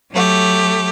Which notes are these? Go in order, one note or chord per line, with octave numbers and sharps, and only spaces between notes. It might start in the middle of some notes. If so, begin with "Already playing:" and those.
F#3 A3 G4